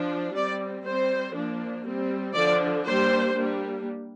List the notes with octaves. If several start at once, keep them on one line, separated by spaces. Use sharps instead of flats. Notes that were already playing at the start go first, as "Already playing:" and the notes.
Already playing: F3 D4
G3 C4 D5
G3 C4 C5
F3 A#3 D4
G3 C4
D3 F3 D4 D5
G3 A#3 D4 C5
G3 A#3 D4